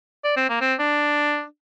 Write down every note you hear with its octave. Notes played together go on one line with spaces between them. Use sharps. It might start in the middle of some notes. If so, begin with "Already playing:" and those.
D5
C4
A#3
C4
D4